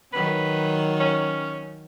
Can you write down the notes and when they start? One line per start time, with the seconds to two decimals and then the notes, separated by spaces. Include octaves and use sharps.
0.13 D#3 F#3 B4
1.00 C#4